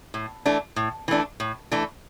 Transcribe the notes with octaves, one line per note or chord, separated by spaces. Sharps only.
A2
E3 A3 D4
A2
E3 A3 D4
A2
E3 A3 D4